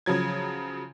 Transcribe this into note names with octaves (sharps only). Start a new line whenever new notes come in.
C#3 F3 F#3 G#6